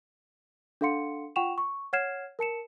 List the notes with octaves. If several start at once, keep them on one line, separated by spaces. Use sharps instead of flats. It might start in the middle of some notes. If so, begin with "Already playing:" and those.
D4 A4 F5 F#5 C6 C#7
F4 F#5 G5 C#6 E7 F7
C#6
C#5 F#5 F6 G#6 C7 E7
A#4 A5 C#7 E7